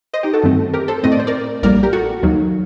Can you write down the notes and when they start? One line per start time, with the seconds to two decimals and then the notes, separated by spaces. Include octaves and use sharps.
0.14 C5 D#5
0.23 D#4 G4
0.33 F#4 A4
0.43 G2 D#3 A3 C4
0.73 G4 A#4
0.88 A4 C5
1.03 A2 A3 C4 D#5
1.12 D5
1.20 C5
1.27 A#4 D5
1.63 A#1 A2 G3 A#3 A#4 D5
1.83 G4 A#4
1.93 F#4 A4
2.23 D#2 D#3 F#3 A#3